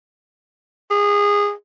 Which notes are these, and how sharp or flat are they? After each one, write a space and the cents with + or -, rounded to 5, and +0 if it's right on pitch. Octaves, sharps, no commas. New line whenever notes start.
G#4 -20